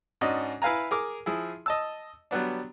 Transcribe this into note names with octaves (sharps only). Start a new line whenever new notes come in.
G#2 C#4 D4 F#4 D5 D#5
E4 B4 F5 G#5 A#5
G#4 A#4 D6
F3 E4 G#4
D#5 A5 E6
F#3 G3 B3 D4